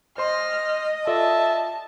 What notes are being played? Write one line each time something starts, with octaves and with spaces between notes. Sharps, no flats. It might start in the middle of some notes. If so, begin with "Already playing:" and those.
C5 D#5 C6 F6
F4 A4 D5 E5 A5